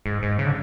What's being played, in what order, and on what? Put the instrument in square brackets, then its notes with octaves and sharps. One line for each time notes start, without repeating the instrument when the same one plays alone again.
[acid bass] G#2
G#2
C#3
D3